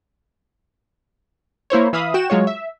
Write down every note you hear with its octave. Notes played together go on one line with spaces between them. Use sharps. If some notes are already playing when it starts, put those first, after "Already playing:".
A#3 E4 C5 C#5
E3 E5 F5 B5 D#6
F#4 G5 E7
F#3 G#3 F4 C#5
E5